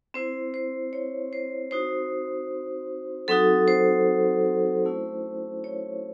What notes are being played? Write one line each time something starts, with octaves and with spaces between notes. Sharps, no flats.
C4 E4 C5
C5
C#5
C5
C4 D#4 F#4 C5
F#3 C4 D#4 F#4 A4
C5
A3 C#4 E4
C#5